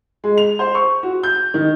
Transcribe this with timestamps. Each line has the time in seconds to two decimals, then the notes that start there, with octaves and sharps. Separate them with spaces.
0.24 G#3
0.38 F7
0.59 C5
0.75 C#6
1.03 F#4
1.23 G6
1.54 D#3